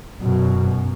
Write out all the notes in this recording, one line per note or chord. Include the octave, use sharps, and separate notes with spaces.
F#2 B2